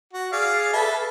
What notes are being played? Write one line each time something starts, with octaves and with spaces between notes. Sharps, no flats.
F#4
G#4 D5 F5
A4 B4 E5